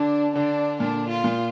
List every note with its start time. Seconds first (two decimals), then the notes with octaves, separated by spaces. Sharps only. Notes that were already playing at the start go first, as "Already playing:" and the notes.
Already playing: D3 D4
0.35 D3 D4
0.80 A#2 D4
1.09 F4
1.24 A#2